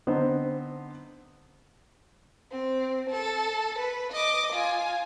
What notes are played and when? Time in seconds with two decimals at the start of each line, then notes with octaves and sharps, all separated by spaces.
0.07 D3 B3 C4 D#4 C5
2.51 C4
3.10 A4
3.79 B4
4.12 D#5 D6
4.52 F4 G#5